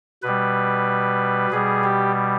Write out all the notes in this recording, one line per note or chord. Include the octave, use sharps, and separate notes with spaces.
B2 G3 B4
B2 G3 G#4
G4